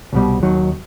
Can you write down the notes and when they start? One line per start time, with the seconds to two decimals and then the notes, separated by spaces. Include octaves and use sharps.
0.13 C2 B2 G3
0.43 D#2 D#3 F#3